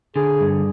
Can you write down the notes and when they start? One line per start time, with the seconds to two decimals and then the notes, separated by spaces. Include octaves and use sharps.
0.16 D3 G#4
0.41 G2